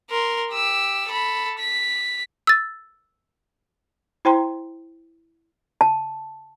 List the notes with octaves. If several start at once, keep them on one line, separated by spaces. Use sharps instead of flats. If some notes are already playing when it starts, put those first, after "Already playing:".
A#4 C6
G4 E6
A4 B5
B6
E6 A6
E4 C5 G5 A#5 C6
A5